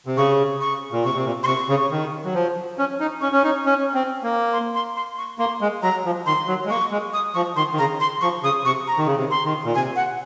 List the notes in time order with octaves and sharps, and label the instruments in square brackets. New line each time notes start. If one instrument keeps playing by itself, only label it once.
[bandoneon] C3
[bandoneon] C#3 [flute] C#6
[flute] C#6
[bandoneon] A#2
[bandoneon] C3 [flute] C#6
[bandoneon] C3
A#2
[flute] C6
[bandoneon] C3 [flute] C#6
[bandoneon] C#3
D#3
F#3
F3
C#4
D#4
[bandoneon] C#4 [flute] C#6
[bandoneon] C#4
D#4
C#4
C4
A#3
[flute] C6
C6
C6
C#6
[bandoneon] A#3 [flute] C6
[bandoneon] G#3
[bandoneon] F#3 [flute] A#5
[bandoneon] F3
[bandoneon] D#3 [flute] C6
[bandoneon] F#3
G#3
[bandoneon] A#3 [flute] C#6
[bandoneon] G#3
[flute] D#6
[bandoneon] F3 [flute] C#6
[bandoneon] D#3 [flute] C6
[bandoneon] D#3
[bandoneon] C#3 [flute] A#5
[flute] C6
[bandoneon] F3 [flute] C#6
[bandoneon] C#3 [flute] D#6
[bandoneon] C3 [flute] C#6
[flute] A#5
[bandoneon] D#3
C#3
C3
[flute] C6
[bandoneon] D#3
A#2
[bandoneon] C3 [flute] G#5
[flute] F#5